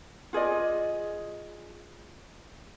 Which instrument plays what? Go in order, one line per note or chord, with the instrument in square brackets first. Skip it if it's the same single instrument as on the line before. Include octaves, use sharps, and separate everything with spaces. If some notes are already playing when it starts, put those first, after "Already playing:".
[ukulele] F4 G#4 D5 D#5